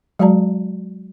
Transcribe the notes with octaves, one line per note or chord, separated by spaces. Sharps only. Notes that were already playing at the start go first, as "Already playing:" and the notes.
F#3 G#3 F#4 D5 A5 A#5